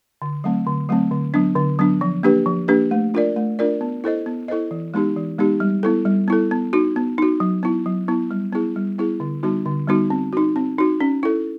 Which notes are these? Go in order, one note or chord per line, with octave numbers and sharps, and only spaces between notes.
D3
F#3 A3 C4
D3
F#3 A3 C4
D3
F#3 B3 D4
D3
F#3 B3 D4
F3
A#3 D4 G4 B4
F3
A#3 D4 G4 B4
A3
D4 F4 A#4 D5
A3
D4 F4 A#4 D5
B3
E4 A4 C5 D#5
B3
E4 A4 C5 D#5
E3
G#3 B3 D#4 G4
E3
G#3 B3 D#4 G4
G3
B3 E4 A4
G3
B3 E4 A4
B3
D#4 F#4
B3
D#4 F#4
F#3
B3 E4
F#3
B3 E4
G3
B3 E4 G#4
G3
B3 E4 G#4
D3
G3 B3 D#4 F#4
D3
G3 B3 D#4 F#4
C4
D#4 F#4
C4
D#4 F#4
C#4
E4 A4